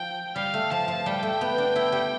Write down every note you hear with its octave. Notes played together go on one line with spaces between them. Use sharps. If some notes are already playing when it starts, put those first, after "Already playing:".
Already playing: F3 G5
G3 F5
A3
F3 A5
F3
G3 G5
A3
B3
D4
E4
G3